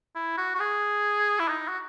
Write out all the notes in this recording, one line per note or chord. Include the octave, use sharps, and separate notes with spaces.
E4
F#4
F#4
G#4
E4
D#4
F#4